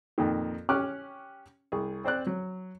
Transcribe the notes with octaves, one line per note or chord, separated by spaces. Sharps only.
F2 A#2 D#3
C#4 G4 C#6 D6 F6 F#6
C2 G#4
C4 C5 D5 F#6
F#3